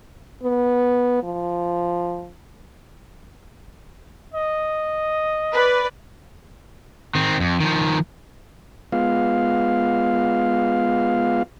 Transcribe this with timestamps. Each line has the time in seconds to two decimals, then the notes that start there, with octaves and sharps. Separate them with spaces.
0.43 B3
1.23 F3
4.34 D#5
5.54 B4 D5
7.15 D#3 C4
7.40 F2
7.60 D#3 F3
8.92 G#3 B3 F4 F5